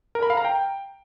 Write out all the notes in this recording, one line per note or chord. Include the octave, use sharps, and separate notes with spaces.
A#4
B5
F5
A#5
G5